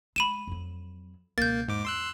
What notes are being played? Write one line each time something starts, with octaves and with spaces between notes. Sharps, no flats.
G#3 B5 D#7 E7
F2 F#3
C#2 B2 A#3 G6 A6
E2 G#2 D6
C6 E6 F#6